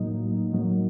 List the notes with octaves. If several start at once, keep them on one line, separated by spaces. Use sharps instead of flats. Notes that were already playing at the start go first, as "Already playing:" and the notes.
Already playing: A2 F#3 A#3 D#4
A2 F#3 A#3 D#4